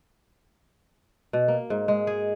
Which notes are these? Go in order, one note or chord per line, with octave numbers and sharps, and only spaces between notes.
B2
A#3
G#2
G#3
G#4